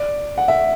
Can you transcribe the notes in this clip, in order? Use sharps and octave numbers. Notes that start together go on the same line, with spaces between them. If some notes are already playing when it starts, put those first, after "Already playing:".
Already playing: D5
F#5
E5